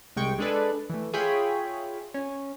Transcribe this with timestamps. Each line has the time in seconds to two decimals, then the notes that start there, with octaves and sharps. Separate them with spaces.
0.16 C2 G#3 G5 C#6
0.39 G#3 D4 G#4 A4 B4 D5
0.90 E3 A3
1.13 F4 G#4 C#5 E5 G5 B5
2.14 C#4